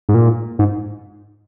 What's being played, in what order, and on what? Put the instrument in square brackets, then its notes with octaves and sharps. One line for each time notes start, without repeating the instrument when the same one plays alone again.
[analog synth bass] G#2
A#2
G#2